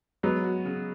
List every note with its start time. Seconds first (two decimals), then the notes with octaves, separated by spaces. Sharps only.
0.23 F#3 G#3 B3
0.44 F#4
0.65 C#3